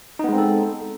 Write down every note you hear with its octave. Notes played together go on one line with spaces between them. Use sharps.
G#3 B3 C4 D#4 A4